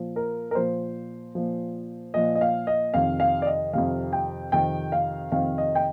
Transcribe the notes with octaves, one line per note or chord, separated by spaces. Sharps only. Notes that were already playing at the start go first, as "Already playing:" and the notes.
Already playing: A#2 F3
A#4
A#4
A#2 F3 C5
A#2 F3
A#2 F3 D#5
D#5
F5
D#5
F2 C3 D#3 F5
F5
D5
D#5
F2 C3 D#3 F5
G5
F2 C3 D#3 G5
F5
F2 C3 D#3 F5
D#5
G5